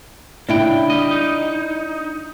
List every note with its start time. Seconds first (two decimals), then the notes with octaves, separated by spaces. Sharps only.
0.49 C#3 D4 E4 G5
0.90 G3 D#5
1.11 D#4